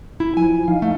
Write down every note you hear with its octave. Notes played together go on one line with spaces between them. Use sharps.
E4
F3 G#5
D#4 F5
A3